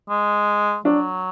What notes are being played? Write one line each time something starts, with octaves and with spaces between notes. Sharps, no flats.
G#3
F#3 D4